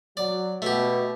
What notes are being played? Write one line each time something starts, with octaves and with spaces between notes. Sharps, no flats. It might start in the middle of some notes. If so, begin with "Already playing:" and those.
F#3 D5
B2 A3 G4